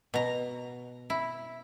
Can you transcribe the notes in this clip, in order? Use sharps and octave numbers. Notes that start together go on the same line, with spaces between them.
B2 A#5
E4